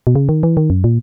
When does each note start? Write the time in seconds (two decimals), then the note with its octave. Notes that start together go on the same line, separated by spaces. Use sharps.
0.07 B2
0.15 C#3
0.29 D#3
0.43 E3
0.57 D#3
0.70 F#2
0.84 A#2